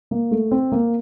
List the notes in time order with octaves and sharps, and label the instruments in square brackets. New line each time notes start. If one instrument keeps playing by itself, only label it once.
[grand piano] A#3
A3
C4
A#3